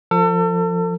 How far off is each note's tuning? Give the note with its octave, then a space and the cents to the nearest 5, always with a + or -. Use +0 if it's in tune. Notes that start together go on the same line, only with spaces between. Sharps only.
F3 +0 A4 +35